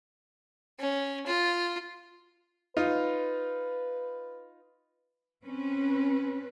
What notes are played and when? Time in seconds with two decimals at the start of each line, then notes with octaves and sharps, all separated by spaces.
0.79 C#4
1.26 F4
2.77 D#4 F4 B4
5.45 C4 C#4 B4